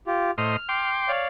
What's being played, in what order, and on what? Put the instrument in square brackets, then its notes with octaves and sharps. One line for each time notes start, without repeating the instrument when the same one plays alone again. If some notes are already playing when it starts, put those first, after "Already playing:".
[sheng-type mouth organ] F4 G4
[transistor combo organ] A2 C5 D#5 [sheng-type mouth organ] F6
[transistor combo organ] G5 C6 D6
[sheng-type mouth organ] C#5 D5 F5